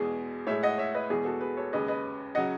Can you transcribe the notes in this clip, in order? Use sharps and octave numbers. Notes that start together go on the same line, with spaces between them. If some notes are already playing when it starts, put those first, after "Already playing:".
Already playing: E2 B2 G#3 G#4
A2 G#3 C#5 E5
D#5 F#5
C#5 E5
B4 D#5
E2 B2 G#3 G#4
F#4 A4
G#4 B4
A4 C#5
D#2 C#3 G#3 B4 D#5
B4 D#5
C#3 F#3 D#5 F#5